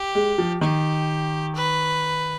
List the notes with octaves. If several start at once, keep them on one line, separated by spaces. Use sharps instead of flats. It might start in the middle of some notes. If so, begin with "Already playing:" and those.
Already playing: G4
G#3
F3
D#3 G4
B4